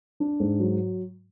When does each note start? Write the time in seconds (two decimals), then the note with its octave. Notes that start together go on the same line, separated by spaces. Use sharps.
0.20 D4
0.40 G#2
0.60 F#3